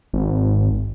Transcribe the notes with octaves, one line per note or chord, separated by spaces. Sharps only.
G#1